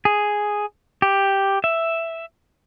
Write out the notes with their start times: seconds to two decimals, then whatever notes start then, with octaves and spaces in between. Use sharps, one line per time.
0.05 G#4
1.02 G4
1.64 E5